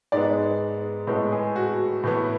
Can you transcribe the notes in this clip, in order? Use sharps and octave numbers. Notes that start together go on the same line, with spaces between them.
G#2 G#3 B3 D5
A2 G#3 B3
G#4
F#4
A2 E3 B3